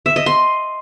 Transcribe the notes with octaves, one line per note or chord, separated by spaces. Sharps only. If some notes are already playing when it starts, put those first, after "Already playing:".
E5
D#5
C6